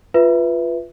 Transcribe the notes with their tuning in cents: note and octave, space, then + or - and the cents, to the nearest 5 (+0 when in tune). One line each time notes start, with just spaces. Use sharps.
F4 +0 B4 +0 E5 +0